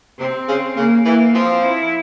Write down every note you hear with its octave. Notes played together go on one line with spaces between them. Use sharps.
C3 C4
C#3
C#3 A#3
E3 A#3
F3 C4
E4